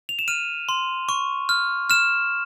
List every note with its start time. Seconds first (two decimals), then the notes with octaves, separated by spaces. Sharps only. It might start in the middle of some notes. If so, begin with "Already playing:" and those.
0.09 F7
0.19 E7
0.28 F6 D#7
0.69 C6
1.09 C#6
1.49 F6
1.90 F6 E7